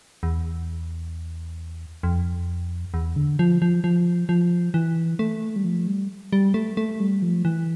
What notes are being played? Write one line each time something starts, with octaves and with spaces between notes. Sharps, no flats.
E2
F2
E2
D3
F3
F3
F3
F3
E3
A3
G3
F3
G3
G3
A3
A3
G3
F3
E3